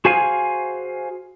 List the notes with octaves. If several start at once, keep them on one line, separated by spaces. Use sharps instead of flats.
F#4 G#4 C5 F5 G#5